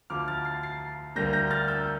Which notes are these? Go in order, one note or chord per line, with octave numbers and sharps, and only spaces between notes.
D2 D3 F3 D6 F6
F6 A6
A6 C7
A6 C7
D2 D3 G3 A#3 G6 A#6
G6 A#6
F6 A6
E6 G6